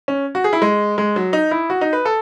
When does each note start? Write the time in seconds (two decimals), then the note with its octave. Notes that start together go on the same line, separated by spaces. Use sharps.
0.08 C#4
0.35 F#4
0.44 G#4
0.53 E4
0.62 G#3
0.98 G#3
1.16 F#3
1.33 D#4
1.51 E4
1.70 F#4
1.81 D#4
1.93 B4
2.05 A4